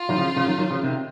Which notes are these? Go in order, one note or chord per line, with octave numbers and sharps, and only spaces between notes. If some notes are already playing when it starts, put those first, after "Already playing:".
Already playing: F4
D#3 F#3
C#3 F3
C#3 F3
D#3 F#3
D#3 F#3
C#3 F3
C3 D#3